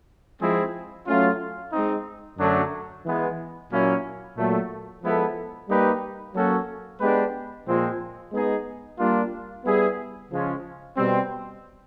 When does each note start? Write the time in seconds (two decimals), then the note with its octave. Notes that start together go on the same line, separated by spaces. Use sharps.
0.40 F3 G#3 C4 E4 G#4
1.07 F#3 A3 C#4 F4
1.72 G#3 C4 D#4
2.38 F#2 D3 F#3 A3 D4
3.04 E3 G#3 B3
3.71 A#2 F#3 A#3 C#4 E4
4.36 A#2 F#3 A3
5.02 F3 G#3 B3 E4 A4
5.68 G3 A#3 D#4 G4 B4
6.34 F#3 A#3 C#4 F#4 A4
7.00 G#3 B3 D4 G4 B4
7.66 A#2 F3 G#3 C4
8.32 G#3 B3 D#4 G#4
8.98 G3 A#3 D4 F4
9.64 G3 B3 E4 G#4
10.31 C#3 F3 G#3 C#4 F4
10.96 B2 G3 C4